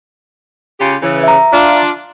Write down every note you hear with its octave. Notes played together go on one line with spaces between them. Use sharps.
C#3 F4 G4
C#3 E3
E5 A#5
D4 F4